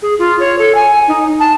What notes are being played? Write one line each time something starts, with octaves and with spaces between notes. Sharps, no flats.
G#4
F4
C#5
A4
G#5
D#4
A5